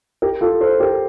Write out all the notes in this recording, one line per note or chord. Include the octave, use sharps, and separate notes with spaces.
G4 A#4
F4 A4
A4 C5
G4 A#4